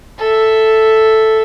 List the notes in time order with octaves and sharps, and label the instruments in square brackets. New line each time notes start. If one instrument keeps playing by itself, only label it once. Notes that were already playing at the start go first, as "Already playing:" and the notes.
[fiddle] A4 E5